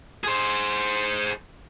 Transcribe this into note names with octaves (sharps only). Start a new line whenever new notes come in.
G#4 C5